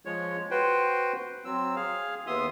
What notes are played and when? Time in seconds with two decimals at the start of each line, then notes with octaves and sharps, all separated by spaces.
0.05 F3 G#3 C#5
0.51 F#4 B4 C5 G5
1.45 F#3 C4 E6
1.76 G#4 F5
2.27 D#2 B3 E5 C6 D#6